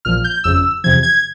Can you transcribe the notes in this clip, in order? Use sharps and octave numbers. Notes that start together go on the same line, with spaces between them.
A#1 A#2 F3 F6
G6
G1 F2 C#3 E6
E2 C3 F3 G#6
G#6